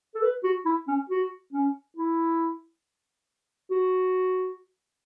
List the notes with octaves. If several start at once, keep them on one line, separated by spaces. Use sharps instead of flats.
A4
B4
F#4
E4
C#4
F#4
C#4
E4
F#4